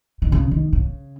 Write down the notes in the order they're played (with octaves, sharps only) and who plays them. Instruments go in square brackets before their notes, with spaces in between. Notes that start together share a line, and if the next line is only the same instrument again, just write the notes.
[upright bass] D#3
C#3
D#3
C#3